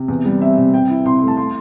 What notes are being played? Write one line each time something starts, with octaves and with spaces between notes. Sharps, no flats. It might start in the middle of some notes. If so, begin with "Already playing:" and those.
Already playing: C3
E2
G3
C4 E5
C3
C3 G5
E4
C3 C6
A3
A5
C6